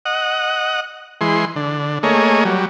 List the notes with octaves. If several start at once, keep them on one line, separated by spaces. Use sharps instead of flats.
D#5 F#5
E3 G#3 C6
D3
A3 A#3 G#4 C#5 D#5
F#3 G3